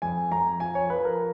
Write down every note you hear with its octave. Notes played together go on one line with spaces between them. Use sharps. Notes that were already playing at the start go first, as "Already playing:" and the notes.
F2 G#5
F2 A#5
F3 G#5
C#5
F3 B4
A#4